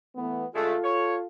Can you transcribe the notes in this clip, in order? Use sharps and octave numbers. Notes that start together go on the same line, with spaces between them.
E3 A3 B3
D3 G#3 A3 F4 A4
C#5